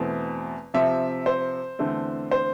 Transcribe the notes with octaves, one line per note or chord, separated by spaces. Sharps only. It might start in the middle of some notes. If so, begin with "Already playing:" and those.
Already playing: E2 B2 A3 C4
C3 F3 C4 E5
C5
E2 D3 A3 C4
C5